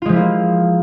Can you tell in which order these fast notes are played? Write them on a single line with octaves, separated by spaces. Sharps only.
F4 G#3 F3 E4 A#3